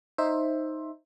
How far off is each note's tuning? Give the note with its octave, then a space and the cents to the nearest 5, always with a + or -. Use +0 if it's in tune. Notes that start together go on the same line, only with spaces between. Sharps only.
D#4 +0 C5 +10 E5 +0